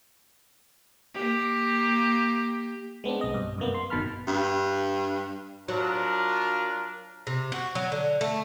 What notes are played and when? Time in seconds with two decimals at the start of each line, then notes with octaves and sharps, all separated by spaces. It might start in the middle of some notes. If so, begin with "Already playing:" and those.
1.14 A#3 G4
3.04 G#3 B3 C4 D4
3.21 B1 D#5
3.34 G2
3.58 F#2 C3 A#3 B3
3.74 C6
3.90 G1 B2 D#3 A5 B5 F6
4.27 G2
5.68 F#3 D4 F4 A#4
7.27 C3
7.52 F#4
7.75 F#3
7.92 D3
8.21 A3